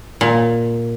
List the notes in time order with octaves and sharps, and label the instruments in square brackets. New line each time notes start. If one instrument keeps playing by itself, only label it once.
[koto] A#2